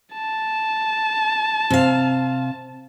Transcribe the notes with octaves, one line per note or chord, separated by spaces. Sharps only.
A5
C3 F5